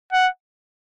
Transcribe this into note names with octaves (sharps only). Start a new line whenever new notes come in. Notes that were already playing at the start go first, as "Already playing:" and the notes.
F#5